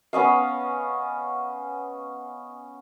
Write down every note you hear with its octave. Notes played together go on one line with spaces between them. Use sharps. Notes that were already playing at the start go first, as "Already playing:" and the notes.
B3 C#4 D#5 F5